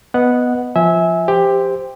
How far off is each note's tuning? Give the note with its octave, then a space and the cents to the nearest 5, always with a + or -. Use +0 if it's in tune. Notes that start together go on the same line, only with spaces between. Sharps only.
B3 +0 D#5 +0 F#5 -5
F3 +0 E5 -20 G#5 +0
G4 +15 C5 -10